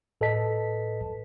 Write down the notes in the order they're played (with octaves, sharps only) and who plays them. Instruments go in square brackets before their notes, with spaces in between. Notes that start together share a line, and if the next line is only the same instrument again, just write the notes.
[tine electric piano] A2 A4 B4 D#5 A5 B6